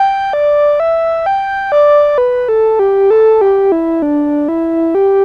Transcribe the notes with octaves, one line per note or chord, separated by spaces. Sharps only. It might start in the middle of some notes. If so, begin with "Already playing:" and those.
Already playing: G5
D5
E5
G5
D5
B4
A4
G4
A4
G4
E4
D4
E4
G4